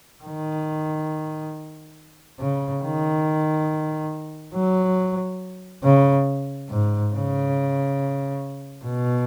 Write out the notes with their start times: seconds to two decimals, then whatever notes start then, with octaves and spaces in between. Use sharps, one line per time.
0.24 D#3
2.40 C#3
2.83 D#3
4.55 F#3
5.84 C#3
6.69 G#2
7.13 C#3
8.85 B2